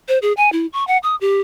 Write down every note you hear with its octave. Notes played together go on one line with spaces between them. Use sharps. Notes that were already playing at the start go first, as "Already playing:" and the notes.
C5
G#4
G#5
E4
C#6
F#5
D#6
G4